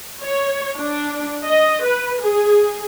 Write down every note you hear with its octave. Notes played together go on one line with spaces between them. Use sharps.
C#5
D4
D#5
B4
G#4